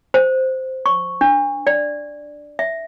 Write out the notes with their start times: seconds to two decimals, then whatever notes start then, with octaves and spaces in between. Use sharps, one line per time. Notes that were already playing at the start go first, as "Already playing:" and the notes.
0.14 C5
0.86 C#6
1.21 D4
1.67 D5
2.59 E5